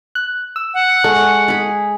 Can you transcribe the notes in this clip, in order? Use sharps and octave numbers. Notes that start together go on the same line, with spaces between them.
F#6
E6
F#5
G#3 A4 C#6
G#4 B5